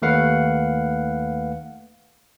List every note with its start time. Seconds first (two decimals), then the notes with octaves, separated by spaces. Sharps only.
0.02 D#2 A3 B4 F5 F#5